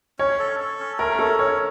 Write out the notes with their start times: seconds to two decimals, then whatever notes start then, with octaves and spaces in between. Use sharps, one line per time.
0.19 C#4 C#5
0.39 A4
0.59 A4
0.79 C#4
0.99 A3 A#4
1.19 C#4 A4
1.39 C#4 C#5